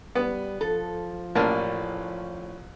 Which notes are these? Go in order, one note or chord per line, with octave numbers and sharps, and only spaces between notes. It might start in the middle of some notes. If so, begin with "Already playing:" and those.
G3 B3
F3 A4
A1 A2 A#3 C#4 D5 A5